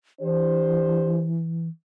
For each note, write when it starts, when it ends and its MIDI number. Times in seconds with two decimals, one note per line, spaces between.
0.21 1.68 52
0.21 1.26 62
0.21 1.26 67
0.21 1.26 72